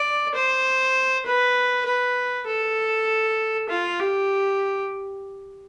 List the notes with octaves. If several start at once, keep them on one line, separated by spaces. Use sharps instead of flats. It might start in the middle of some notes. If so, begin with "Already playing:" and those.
Already playing: D5
C5
B4
B4
A4
F4
G4